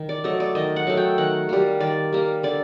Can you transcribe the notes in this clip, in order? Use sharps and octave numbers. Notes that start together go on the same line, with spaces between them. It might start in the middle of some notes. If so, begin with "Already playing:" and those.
Already playing: D#3
D5
F#3 A3 D#5
D5
D#3 D#5
F#5
F#3 A3
G5
D#3 F#5
G3 A#3
D#3 D5
G3 A#3
D3 D5